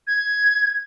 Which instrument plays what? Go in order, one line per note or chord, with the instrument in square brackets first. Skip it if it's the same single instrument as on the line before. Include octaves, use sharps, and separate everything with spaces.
[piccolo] G#6